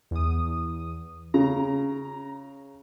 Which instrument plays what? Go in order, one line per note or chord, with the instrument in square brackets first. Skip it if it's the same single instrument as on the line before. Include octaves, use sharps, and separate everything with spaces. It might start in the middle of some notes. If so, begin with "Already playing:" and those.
[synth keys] E2 D#6
[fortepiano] C#3 [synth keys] A#5